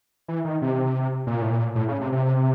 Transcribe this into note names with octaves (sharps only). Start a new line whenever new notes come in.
E3
D#3
C3
A#2
A2
A#2
A2
C#3
C3
C3